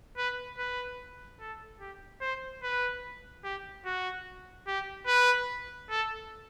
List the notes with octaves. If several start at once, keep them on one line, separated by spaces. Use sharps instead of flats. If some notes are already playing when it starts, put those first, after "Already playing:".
B4
B4
A4
G4
C5
B4
G4
F#4
G4
B4
A4